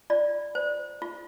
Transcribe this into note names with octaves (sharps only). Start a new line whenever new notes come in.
F4 D5
C5
F4